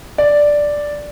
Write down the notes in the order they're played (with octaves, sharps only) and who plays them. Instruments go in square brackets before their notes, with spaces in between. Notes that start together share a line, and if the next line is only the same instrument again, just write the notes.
[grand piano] D5